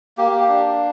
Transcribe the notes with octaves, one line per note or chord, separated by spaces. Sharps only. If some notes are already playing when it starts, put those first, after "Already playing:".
A#3 G4
G4
D4 G4